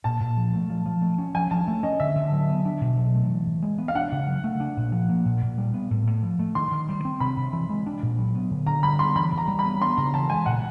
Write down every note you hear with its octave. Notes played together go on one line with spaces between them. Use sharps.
A#2 A5
A#2
F3
A3
F3
F3
A3
C#4
F3 G#5
F3 A5
A3
C#4 D#5
D3 E5
D3
F#3
B3
D4
B2
F#3
A3
E3
E3
G#3
B3
F5
D4 F#5
C#3
F#3
A3
D4
A#2
F3
A#3
A#2
A#2
G3
B3
A2
A2
F3
A3
D#3 C6
D#3
G3
C4
C3 B5
C3
E3
G#3
D4
A#2
F#3
B3
D3
D3 A#5
G3 B5
B3 C6
E3 B5
E3 A#5
G3
B5
B3
B3 C6
C#3 A#5
E3 A5
G#3 G#5
A#2 F#5